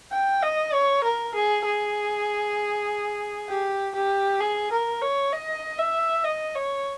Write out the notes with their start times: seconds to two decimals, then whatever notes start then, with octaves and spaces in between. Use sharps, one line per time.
0.12 G5
0.43 D#5
0.73 C#5
1.04 A#4
1.34 G#4
1.65 G#4
3.49 G4
3.95 G4
4.40 G#4
4.71 A#4
5.01 C#5
5.33 D#5
5.78 E5
6.24 D#5
6.55 C#5